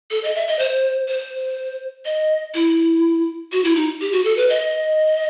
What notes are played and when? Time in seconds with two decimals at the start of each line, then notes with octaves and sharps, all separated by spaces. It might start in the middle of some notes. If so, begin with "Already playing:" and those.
0.11 A4
0.23 D#5
0.35 E5
0.48 D#5
0.59 C5
1.08 C5
2.05 D#5
2.54 E4
3.52 F#4
3.64 E4
3.75 D#4
4.01 G4
4.12 F#4
4.25 A4
4.37 B4
4.50 D#5